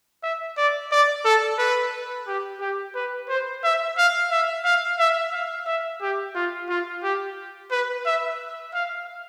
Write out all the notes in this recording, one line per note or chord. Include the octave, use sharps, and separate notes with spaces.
E5
D5
D5
A4
B4
G4
G4
B4
C5
E5
F5
E5
F5
E5
F5
E5
G4
F4
F4
G4
B4
E5
F5